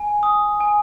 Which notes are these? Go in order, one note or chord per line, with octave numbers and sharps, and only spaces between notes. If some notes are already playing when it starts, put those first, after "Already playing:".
Already playing: G#5
D#6
G#5